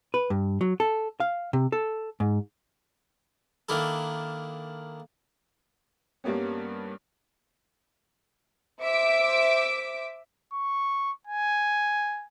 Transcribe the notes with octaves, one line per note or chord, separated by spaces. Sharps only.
B4
G2
F#3
A4
F5
C3
A4
G#2
D#3 A#3 D4 E4 A4
G2 G3 A#3 B3 C#4
C5 E5 D6 B6 D7
C#6
G#5